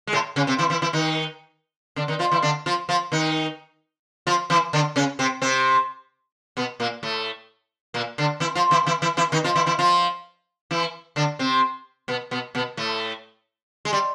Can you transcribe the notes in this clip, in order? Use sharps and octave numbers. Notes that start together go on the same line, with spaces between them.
G#3
A2 A3
C#3 C#4
C3 C4
E3 E4
E3 E4
E3 E4
D#3 D#4
D3 D4
D#3 D#4
F3 F4
E3 E4
D3 D4
F3 F4
F3 F4
D#3 D#4
F3 F4
E3 E4
D3 D4
C#3 C#4
C3 C4
C3 C4
B2 B3
A#2 A#3
A2 A3
A#2 A#3
D3 D4
E3 E4
F3 F4
E3 E4
E3 E4
E3 E4
E3 E4
D#3 D#4
F3 F4
E3 E4
E3 E4
F3 F4
E3 E4
D3 D4
C3 C4
B2 B3
B2 B3
B2 B3
A2 A3
G#3
G3